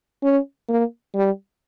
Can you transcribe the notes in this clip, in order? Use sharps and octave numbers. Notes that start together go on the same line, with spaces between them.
C#4
A#3
G3